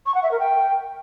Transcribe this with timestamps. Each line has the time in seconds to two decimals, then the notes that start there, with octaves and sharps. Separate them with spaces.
0.06 C#6
0.15 F#5
0.23 E5
0.31 A#4
0.40 G5